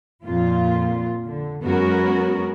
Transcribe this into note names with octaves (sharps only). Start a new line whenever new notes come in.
F2 A#2 F4
D3
F#2 G#3 B3 C#4 F#4 A#4